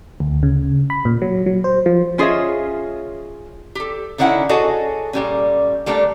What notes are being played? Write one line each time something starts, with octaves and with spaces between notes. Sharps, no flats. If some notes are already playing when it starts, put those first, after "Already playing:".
D2
C#3
B5
A#2
F#3
F#3
C5
F3
C#4 F4 G#4 C#5 D#5 E5
G4 A4
D3 D#3 C#4 E4 F#5
F#4 G#4 A4 C#5 D#5 G#5
A#2 G3 C#4
G3 A3 A#3 D4